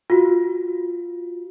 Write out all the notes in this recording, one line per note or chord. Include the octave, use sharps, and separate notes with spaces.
F4 F#4